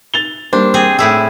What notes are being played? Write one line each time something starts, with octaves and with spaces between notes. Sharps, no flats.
A6 F7 G7
G3 A#3 D4 C5
C4 G#4
A2 E4 G#4 E6